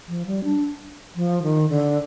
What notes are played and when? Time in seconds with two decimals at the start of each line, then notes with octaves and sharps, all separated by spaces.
0.08 F3
0.26 G3
0.44 D4
1.16 F3
1.43 D#3
1.69 D3